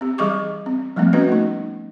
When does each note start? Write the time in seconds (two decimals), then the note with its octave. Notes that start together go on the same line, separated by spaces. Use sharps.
0.01 C4 G4
0.18 E3 G3 G#4 D#5 C#6 D6
0.66 C4
0.96 F3 G3 A3 A#3 C4
1.13 B3 C#4 F#4 B4 D#5
1.29 A3 D#4